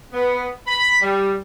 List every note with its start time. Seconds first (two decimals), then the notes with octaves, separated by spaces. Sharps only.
0.13 B3
0.67 B5
1.02 G3